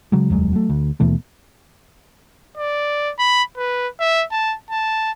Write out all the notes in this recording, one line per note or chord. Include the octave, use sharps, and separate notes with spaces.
C#3 F#3 G#3
F1 D#2 F#3 G#3
F#3 A3
D2
D#2 B2 E3 A3
D5
B5
B4
E5
A5
A5